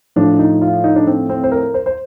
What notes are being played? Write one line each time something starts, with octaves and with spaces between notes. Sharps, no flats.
A2 F3 D4
D#4
F4
D#4
D4
C4
C4
C5
A#4
C5
C5